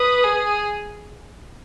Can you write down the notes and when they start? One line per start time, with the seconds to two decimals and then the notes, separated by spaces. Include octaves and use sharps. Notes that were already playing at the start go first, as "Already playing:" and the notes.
Already playing: B4 D#6
0.24 G#4